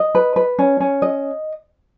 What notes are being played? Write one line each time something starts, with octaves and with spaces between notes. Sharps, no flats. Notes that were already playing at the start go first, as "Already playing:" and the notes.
Already playing: D#5
B4
B4
C#4
C#4
D#5